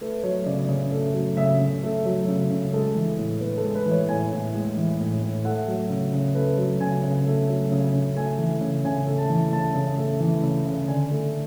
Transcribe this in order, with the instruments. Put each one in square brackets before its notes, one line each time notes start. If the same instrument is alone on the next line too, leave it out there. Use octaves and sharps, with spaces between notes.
[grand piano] A3 B4
F#3 C#5
C#3 D5
C#3
A3
F#3
C#3 E5
C#3
A3
F#3
C#3
C#3
G#3 A4
E3
A2
A2 B4
A4
G#3
B4
E3
C#5
A2 G#5
A2
G#3
E3
A2
A2
A3 F#5
F#3
C#3
C#3
A3 B4
F#3
C#3 G#5
C#3
A3
F#3
C#3
C#3
A3 G#5
E3
C#3
C#3 G#5
A3
A5
E3
C#3 A5
C#3
A3
E3
C#3
C#3
D3 G#5
A3